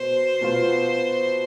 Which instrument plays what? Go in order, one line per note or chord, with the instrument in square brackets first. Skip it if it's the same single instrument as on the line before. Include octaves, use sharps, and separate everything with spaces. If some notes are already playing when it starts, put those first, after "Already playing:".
Already playing: [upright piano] B2 [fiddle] C5
[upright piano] B2 B3 F4